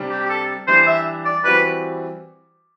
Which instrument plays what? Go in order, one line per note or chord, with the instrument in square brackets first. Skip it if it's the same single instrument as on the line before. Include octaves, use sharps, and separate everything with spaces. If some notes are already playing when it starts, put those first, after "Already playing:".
Already playing: [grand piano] C3 G3 D4
[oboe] G4
G4
A4
[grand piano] E3 G3 D4 [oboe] C5
[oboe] E5
D5
[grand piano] E3 G3 C4 F#4 [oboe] B4